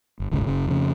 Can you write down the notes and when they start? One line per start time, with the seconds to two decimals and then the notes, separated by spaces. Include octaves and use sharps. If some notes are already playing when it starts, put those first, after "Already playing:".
0.20 G1
0.32 D1 G1 G#2 C#3
0.47 F#1 C#3
0.66 F2 C#3